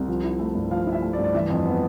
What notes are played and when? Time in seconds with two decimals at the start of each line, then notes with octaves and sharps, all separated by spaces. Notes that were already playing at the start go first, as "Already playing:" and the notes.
Already playing: C2
0.08 F3
0.24 E4
0.39 A3
0.55 G2
0.71 F3 F5
0.87 E4
0.92 E5
1.02 A3
1.13 D5
1.18 G2
1.24 D5
1.34 E3 E5
1.50 F2
1.66 B3